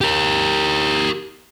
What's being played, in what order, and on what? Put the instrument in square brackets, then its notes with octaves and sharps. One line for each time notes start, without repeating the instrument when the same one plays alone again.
[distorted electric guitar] G4 A#4